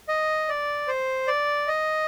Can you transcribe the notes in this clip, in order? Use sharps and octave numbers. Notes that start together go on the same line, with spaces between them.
D#5
D5
C5
D5
D#5